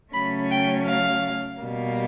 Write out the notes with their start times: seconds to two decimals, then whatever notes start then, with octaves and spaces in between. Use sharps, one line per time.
0.12 C#3 F#3 A3 C#4 B5
0.50 G5
0.86 F5
1.60 B2 G3 A#3